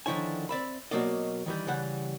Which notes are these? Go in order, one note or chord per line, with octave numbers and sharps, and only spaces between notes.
D3 D#3 F3 E4 C#5 G#5
C4 D5 E5 B5
B2 F3 F#3 A#3 D5 D#5
D#3 E3 G3
C#3 E3 G3 F#5